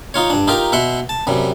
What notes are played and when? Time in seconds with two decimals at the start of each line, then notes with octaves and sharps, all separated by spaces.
0.14 D#4 F4 C#5
0.30 G2 D4
0.47 D#4 F4 G4 A#4
0.72 B2 E5 F#5 C6
1.09 A5
1.27 F#2 C3 G3